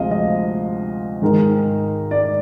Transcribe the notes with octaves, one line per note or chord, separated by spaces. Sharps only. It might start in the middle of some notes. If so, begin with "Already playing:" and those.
Already playing: D2 C3 F3 G#3 D#5 F5
D#5
G#2 D#3 G#3 D#4 A#4
D5